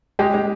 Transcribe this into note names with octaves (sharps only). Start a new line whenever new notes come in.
G#3 G4
G#3